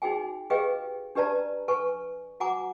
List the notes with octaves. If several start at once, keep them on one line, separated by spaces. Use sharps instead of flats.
D#4 F#4 G#4 G5 G#5
G4 G#4 B4 D#5 F5 G5
D4 G4 B4 D5 A5 A#5
A4 B4 G#5 C#6
F#4 F#5 G#5 A#5 D6